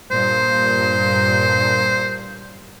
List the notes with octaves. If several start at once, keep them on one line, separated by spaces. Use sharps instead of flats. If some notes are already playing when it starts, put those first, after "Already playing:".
G2 A#2 C5